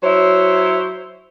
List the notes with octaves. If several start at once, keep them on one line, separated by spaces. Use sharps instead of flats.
F#3 E4 C5 C#5